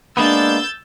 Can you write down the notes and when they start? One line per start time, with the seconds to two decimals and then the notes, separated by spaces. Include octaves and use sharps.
0.17 G#3 A#3 B3 D4 E6 G6 A6